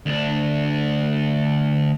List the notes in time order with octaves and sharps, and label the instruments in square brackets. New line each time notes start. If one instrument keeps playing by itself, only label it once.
[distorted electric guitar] D2 D4